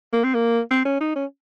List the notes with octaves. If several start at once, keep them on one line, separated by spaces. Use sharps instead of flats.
A#3
C4
A#3
C4
C#4
D#4
C#4